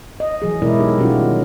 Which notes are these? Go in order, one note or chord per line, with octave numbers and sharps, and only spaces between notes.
D#5
E3 F#3 G#4
B2 G#3 E4 A#4 D5
D#4 G4
B2 F#3 G3 C#4 F4 F#4
D#3